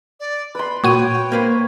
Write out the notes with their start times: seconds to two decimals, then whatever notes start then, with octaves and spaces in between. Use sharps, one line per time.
0.20 D5
0.55 B4 B5 C6
0.84 A#2 F#4 C#5 G5 D#7
1.32 A#3 B4 C5